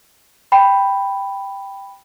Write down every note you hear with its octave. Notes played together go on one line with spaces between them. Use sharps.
G5 B5